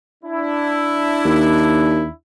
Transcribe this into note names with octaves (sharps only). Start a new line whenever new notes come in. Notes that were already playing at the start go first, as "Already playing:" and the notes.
D4 E4
D#2